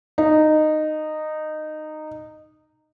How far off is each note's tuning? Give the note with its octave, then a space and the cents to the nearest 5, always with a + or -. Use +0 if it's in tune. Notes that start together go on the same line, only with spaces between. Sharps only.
D#4 -15